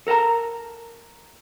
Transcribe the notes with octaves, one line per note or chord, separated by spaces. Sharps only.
A4 A#4 F#5 A5 A#5